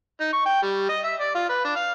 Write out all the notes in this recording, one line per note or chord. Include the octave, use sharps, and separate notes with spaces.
D#4
C#6
G5
G3
D#5
E5
D5
F4
B4
D4
F5